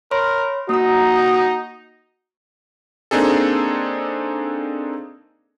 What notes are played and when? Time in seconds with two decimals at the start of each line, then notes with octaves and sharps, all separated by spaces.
0.11 A#4 C#5 B5 C6
0.69 A#3 D#4 F#4 A#5 D#6
3.11 A#3 C4 D4 D#4 G#4 A4